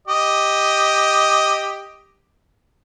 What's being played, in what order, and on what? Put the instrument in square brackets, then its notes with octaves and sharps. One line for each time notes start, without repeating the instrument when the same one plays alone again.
[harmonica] G4 D#5